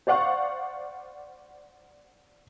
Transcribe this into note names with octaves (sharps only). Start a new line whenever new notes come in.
C5 D5 F5 F#5 C#6